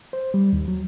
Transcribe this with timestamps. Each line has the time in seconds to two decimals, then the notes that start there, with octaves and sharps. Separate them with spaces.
0.13 C5
0.34 G3
0.53 D#2
0.68 F#3